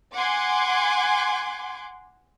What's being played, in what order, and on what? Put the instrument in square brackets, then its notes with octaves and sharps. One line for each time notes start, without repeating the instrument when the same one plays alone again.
[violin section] F#5 G#5 C6 D6